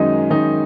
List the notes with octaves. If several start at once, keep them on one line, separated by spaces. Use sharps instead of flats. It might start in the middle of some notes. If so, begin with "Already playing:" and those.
Already playing: F#2 D#3 G#3 D#4 D#5
F#2 D#3 G#3 D#4